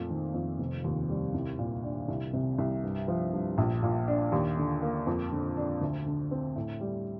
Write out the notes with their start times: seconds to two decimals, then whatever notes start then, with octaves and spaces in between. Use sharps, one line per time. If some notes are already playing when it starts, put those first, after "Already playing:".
Already playing: F2 A#2 A3
0.10 D#3
0.34 F2
0.59 F1
0.84 D#2
1.09 G3
1.34 C2
1.59 A#2
1.84 D4
2.08 C2
2.33 C3
2.59 C2
2.83 G2
3.08 F3
3.33 G2
3.58 A#1
3.83 A#2
4.08 D4
4.32 D#2
4.57 D3
4.82 A#3
5.07 F2
5.32 D3
5.57 D4
5.81 D2
6.06 D3
6.31 C4
6.56 A2
6.81 G3